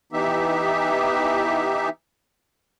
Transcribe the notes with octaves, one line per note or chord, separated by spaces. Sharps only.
E3 B3 D#4 G4 E5